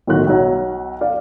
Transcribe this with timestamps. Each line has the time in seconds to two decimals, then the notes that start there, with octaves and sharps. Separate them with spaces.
0.07 B1 A2 D#3 F#4 F#6
0.27 B1 F#3
1.01 D5 F5